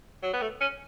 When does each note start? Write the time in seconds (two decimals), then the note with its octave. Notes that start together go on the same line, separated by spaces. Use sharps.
0.23 F#3
0.33 B3
0.41 A3
0.61 C#4